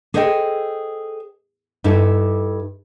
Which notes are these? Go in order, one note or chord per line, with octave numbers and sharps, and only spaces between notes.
G#4 A4 C5 D#5 E5 G5
G2 G3 D#4 E4 A4